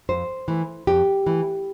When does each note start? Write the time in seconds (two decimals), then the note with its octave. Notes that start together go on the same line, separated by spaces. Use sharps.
0.09 F2 C5
0.48 E3 A3
0.87 F2 G4
1.26 E3 A3